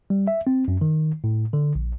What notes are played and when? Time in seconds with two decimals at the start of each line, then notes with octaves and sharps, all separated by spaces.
0.10 G3
0.28 E5
0.47 C4
0.68 F#2
0.81 D#3
1.24 A2
1.53 D3
1.75 A#1